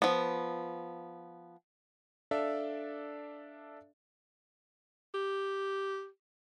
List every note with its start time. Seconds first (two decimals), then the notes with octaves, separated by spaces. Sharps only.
0.02 F3 B3
2.31 D4 A4 D5 E5 F5
5.15 G4